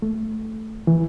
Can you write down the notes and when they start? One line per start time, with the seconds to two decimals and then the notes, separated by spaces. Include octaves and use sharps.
0.02 A3
0.87 E3